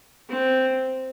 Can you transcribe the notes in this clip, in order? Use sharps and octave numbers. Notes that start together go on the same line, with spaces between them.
C4